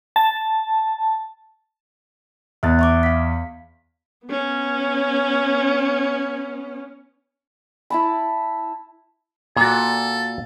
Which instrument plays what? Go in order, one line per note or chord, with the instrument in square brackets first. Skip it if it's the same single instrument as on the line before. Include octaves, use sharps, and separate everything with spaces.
[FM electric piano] A5
[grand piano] E2 [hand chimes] E5 F#6 A6
[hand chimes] E5 C#6 D6
F5 B6
[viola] B3 C#4
[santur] E4 A5 B5
[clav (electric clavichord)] A#2 F#4 [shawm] A4